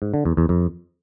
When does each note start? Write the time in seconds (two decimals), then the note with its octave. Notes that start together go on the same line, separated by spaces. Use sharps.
0.02 G#2
0.14 D3
0.25 E2
0.37 E2
0.49 F2